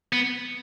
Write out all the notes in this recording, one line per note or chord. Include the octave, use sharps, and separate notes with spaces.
B3